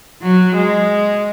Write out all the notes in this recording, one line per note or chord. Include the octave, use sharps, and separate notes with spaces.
F#3
G#3